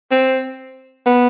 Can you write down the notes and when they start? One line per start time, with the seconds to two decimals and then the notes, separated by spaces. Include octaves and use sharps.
0.11 C4
1.06 B3